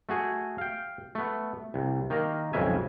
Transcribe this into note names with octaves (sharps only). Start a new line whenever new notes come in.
A3 F#4 G#4
F5 G5
A3 B3
C2
D#3 A#3 A#5
B1 F2 C#3 G#3 E5 G#5